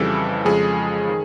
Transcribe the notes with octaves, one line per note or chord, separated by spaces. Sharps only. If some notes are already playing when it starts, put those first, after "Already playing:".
Already playing: F2 C#3 E3 G3 A4
F2 C#3 F3 G#3 G#4
D#3